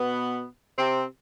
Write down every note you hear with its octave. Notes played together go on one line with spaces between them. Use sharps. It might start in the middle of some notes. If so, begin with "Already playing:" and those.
Already playing: B2 B3
C3 C4